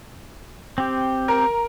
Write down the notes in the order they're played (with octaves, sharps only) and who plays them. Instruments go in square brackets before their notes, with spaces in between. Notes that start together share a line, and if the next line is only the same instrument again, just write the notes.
[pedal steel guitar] C4 G4
[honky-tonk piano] A#4